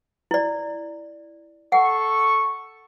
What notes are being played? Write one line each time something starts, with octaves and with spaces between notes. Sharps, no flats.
E4 D5
A4 F#5 C#6